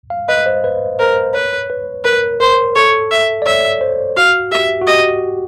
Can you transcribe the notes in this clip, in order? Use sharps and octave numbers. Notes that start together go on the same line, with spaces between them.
F5
B4 D#5
C5
B4
A#4 C5
B4 C#5
B4
A#4 B4
A#4 C5
A4 C#5
E5
D5
C#5 E5
C5
F#4 F5
G4 E5
F#4
G4 D#5